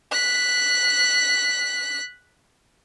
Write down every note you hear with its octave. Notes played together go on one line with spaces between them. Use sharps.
F#6 B6